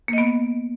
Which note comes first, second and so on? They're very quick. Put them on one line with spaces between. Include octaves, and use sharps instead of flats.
A#3 D#5 B3